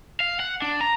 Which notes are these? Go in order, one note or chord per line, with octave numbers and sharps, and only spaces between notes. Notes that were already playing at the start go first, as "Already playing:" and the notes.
F5
F#5
D4
A#5